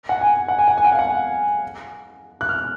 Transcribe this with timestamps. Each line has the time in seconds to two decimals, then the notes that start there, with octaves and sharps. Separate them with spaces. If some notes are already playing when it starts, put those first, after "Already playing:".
0.09 F#5
0.21 G#5
0.48 F#5
0.59 G#5
0.68 F#5
0.78 G#5
0.85 F#5
0.92 F5
0.99 F#5
2.41 F#6
2.49 F6